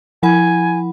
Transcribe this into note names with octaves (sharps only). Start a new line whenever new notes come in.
F3 E4 F#5 G#5 B5